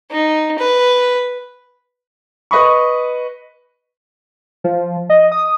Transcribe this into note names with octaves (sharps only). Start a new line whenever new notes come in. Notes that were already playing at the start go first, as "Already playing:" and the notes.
D#4
B4
B4 D#5 B5 C#6
F3
D#5
D#6